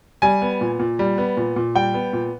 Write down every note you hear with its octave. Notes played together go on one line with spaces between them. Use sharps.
G3 G#5
B3
A#2
A#2
G3
B3
A#2
A#2
G3 G5
B3
A#2